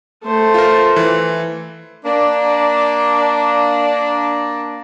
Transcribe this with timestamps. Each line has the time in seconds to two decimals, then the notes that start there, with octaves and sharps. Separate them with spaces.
0.24 A3 C5
0.54 F4 A#4
0.96 E3
2.05 A#3 D4